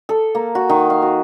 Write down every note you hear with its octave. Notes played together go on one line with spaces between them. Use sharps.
A4
A#3
F#4
D#3
F5
F#4